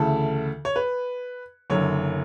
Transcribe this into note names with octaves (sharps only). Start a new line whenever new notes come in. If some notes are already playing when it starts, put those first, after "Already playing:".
Already playing: D2 C#3 E3 A4
C#5
B4
F#1 F#2 D3 C#5